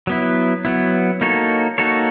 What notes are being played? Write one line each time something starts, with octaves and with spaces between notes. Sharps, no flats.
F#3 B3 E4
F#3 B3 E4
A#3 D#4 F#4 A4 C#5
A#3 D#4 F#4 A4 C#5